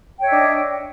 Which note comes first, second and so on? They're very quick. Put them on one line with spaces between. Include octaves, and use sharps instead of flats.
G5 C#5 E5 D#5 D4